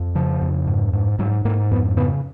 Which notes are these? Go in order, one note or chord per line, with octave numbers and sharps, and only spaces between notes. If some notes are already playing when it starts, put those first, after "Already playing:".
Already playing: F2
C#3 F3
F2
G#2
G#2
G#2 F#3
G#2 A#3
F2 B3
C#3 B3